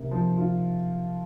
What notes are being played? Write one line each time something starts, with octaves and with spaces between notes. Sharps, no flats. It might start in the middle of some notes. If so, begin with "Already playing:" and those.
Already playing: C3 A#3
F3
F4